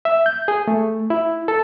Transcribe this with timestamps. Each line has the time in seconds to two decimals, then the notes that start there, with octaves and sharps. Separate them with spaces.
0.05 E5
0.26 G6
0.48 G#4
0.68 A3
1.10 E4
1.48 A4